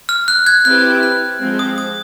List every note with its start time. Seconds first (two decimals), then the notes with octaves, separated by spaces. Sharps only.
0.09 F6
0.28 F#6
0.46 F#6 G#6
0.65 C4 E4 G4 B4 F#6
1.03 F#6
1.41 F3 G#3 C4
1.59 D#6
1.78 D#6